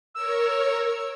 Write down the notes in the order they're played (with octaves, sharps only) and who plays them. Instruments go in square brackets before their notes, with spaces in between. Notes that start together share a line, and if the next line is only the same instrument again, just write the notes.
[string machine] A#4 C#5 [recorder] E6